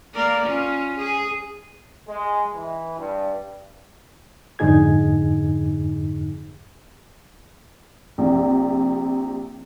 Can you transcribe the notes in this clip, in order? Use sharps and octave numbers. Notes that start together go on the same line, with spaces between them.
A#3 A#4 D5
C#4 F4
G#4
G#3
E3
G2
F2 G#2 D3 D#4 G#4 G#6
A#1 C3